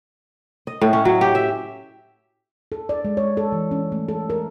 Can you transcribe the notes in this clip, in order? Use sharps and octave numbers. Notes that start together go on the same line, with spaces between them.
D#5
A2
C#4
F#3
G4
E5
A4
D5
G#3
C#5
A4
E3
C#4
A3
A4
A#4